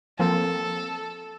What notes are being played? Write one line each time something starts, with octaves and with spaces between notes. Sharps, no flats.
F3 A#3 C4 A4